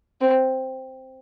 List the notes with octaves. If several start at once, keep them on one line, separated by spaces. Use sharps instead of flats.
C4